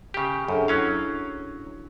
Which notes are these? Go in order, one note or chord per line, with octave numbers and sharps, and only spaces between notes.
C#3 G4
F#2 D4 G#4 A4
F#3 C#4 E4 C#5 F5